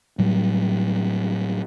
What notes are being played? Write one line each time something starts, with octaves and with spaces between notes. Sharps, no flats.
A2 F#3 G3